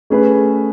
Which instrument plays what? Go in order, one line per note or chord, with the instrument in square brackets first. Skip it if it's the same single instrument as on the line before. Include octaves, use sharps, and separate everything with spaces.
[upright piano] A3 C#4 G#4 B4